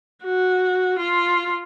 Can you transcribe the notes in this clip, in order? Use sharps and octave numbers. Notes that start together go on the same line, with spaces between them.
F#4
F4